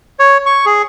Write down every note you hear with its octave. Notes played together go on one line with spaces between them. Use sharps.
C#5
C#6
G#4